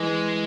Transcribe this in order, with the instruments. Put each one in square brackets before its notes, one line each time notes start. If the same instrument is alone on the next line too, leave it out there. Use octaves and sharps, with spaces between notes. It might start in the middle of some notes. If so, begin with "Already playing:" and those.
Already playing: [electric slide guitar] E3 [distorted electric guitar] G#3